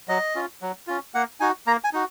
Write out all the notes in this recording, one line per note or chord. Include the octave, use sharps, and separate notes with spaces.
F#3 D#5
C#4 F4
F#3
C#4 F4
A#3 F#5
D#4 F#4 G#5
A#3 A#5
G#5
D#4 F#4